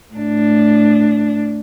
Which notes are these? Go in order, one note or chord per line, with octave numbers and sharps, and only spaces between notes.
A2 D4